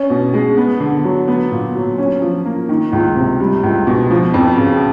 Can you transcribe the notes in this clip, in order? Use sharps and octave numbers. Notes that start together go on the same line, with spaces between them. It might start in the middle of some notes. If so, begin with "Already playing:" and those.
Already playing: C#4
B2
G#3
B3
D3
F#3
B3
A#2
F#3
C#4
F3
A#3
D#3
C#2
C3
G3
C#2
B2
F3
F2
C#3